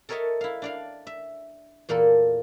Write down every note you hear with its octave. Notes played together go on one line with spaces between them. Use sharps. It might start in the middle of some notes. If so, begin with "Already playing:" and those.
A4 A#4 C#5 D#5 E5 A5
E4 F5
D4 D5 F5
E5
E2 A#2 A#3 A4